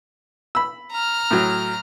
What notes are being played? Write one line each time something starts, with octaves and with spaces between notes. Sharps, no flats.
B5 E6
A#5 F6
A2 F#3